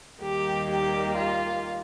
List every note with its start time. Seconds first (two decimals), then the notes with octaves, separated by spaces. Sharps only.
0.22 D#2 D#3 G3 A#3 G4
0.70 G4
1.16 F4